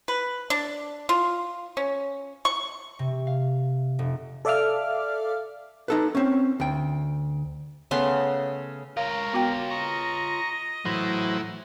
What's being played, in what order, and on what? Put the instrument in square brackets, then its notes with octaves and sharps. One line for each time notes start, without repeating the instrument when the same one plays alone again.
[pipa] B4
D4
F4
C#4
C#6
[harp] C3
F5
F1
[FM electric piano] A4 D5 E5 F5 D6 F6
[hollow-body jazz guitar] D#4 A4 B4
C4 C#4
D2 G5
[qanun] C#3 A3 B3 C6
[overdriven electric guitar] F4 C#5 [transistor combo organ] A#4 [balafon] F5
[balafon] B3 F#4 G5
[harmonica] D#5 [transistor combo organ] A#5 C#6
[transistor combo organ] E3 F#3 C5 [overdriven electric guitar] A3 E4